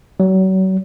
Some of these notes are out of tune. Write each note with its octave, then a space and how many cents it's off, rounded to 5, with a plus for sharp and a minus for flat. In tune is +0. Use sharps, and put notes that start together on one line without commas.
F#3 +35